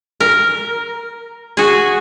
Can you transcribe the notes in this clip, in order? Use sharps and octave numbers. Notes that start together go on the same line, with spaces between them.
A#4
F#4 G#4